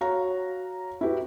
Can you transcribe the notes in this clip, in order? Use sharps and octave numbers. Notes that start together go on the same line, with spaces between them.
F#4 C#5 F5 A#5
E4 F#4 G4 B4